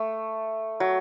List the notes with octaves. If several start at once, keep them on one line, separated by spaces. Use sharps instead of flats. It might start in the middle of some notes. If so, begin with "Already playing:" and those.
Already playing: A3
F#3